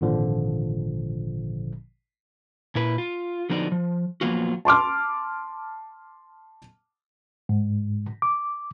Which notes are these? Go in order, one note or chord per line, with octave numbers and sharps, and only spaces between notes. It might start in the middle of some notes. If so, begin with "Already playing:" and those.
G#1 A#2 D3 F3
A#2 E4 B4
F4
D3 F3 B3 D#4 F#4 D5
F3
F3 F#3 A#3 B3 F4 F#4
A5 C6 D6 F6
G#2
D6